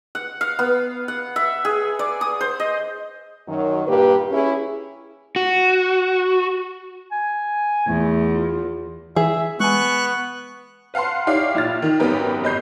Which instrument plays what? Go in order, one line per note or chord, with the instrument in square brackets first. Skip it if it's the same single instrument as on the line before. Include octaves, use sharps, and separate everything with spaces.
[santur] F#5
F5
B3
F#5
E5
G#4
D5
D#6
C5
D#5
[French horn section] F#2 D#3 F#3
G2 A#2 A#3 G4 B4
C#4 E4 G#4
[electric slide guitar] F#4
[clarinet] G#5
[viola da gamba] E2 [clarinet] A3
[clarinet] F4
[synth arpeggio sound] E3 [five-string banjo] G#4 [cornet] E5
[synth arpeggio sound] G#3 G#5 [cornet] B3 [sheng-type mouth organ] C#6 F#6
[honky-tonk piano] B4 F5 F#5 A5 C6
D#4 E4 G4 C#5 D5 F5
A#1 E4 F4 F6 A6
D#3 D#4
G#1 F#2 B3 G4 A#4
G1 D#5 B5 G6 C7